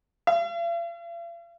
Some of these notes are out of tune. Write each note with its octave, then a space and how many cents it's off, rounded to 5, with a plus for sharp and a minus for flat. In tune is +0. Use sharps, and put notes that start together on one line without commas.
F5 -45